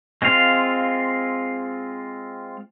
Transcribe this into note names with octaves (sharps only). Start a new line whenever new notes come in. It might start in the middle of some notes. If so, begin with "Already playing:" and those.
G#3 C4 F4 F5